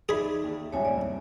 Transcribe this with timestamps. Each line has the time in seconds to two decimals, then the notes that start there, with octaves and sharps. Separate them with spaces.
0.09 D#4 G#4 D5 E5 B5
0.44 D#2
0.72 D#1 C#2 G2 C#5 E5 G#5
0.85 D5
0.97 C2 G2